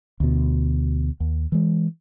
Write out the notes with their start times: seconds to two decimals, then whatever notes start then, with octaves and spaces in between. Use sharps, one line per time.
0.20 D2 B2
1.20 D#2
1.52 E3 G#3